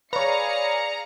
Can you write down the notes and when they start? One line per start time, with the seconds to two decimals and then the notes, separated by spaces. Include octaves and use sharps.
0.13 G#4 B4 C#5 D5 F5 A#5 C#7